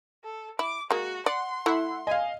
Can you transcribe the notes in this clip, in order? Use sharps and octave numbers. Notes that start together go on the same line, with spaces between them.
A4
E4 D6
G#3 A#3 F#4
D5 F#5 C6
A3 E4 E5 F#5
D#5 F5 G#5